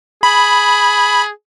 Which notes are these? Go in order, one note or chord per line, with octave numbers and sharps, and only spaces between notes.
G#4 B5